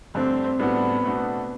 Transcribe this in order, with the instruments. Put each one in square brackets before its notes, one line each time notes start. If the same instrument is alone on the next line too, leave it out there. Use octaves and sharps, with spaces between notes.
[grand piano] G2 D3 A3 D4 [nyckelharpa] C4
[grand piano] A2 G3 D4 F#4 [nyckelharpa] B3
[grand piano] B2 A3 D4 F#4